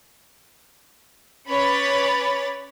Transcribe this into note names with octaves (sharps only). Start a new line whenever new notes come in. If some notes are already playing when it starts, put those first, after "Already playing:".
C#4 B4 C#5 B5 D6 A6